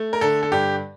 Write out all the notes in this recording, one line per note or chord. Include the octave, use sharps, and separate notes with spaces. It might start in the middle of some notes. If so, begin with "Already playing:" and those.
Already playing: A3
A#4
D3 A4
A4
G2 G4